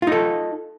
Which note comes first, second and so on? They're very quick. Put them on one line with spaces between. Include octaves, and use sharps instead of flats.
F4 D#4 A4